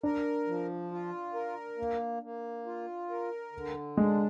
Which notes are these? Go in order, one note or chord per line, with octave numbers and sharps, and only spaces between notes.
D4 A#4
F3
F4
A#4
A#3
A#3
F4
A#4
D3
G#3 D4